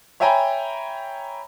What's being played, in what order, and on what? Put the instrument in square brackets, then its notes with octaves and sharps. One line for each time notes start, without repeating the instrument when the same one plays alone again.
[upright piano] C#5 E5 G5 G#5 A#5 B5